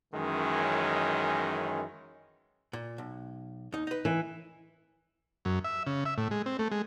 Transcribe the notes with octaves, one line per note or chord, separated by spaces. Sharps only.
F#2 D#3 E3 G#3 C#4
A#2
B1
D#2 D#4
D#4 B4
E3
F#2
E5
C#3
E5
A2
G#3
C4
A3
G#3